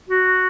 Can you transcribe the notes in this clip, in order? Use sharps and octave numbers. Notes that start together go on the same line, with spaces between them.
F#4